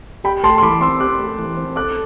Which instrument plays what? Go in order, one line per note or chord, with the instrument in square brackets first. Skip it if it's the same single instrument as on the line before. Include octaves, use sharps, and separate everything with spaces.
[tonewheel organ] G4 [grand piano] G5 B5
[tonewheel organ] A3 [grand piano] A5 C6
[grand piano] C6
[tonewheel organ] E3 [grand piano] B5 D6
[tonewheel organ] C4 [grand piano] C6 E6
[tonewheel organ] G4 [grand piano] D6 F#6
[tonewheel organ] A3
E3
C4
[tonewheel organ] A4 [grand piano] D6 F#6